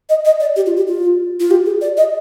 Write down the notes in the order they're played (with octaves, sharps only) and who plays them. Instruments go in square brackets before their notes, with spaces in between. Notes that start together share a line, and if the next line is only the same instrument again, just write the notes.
[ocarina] D#5
D#5
D5
G4
F4
G4
F4
F4
G4
G#4
D5
D#5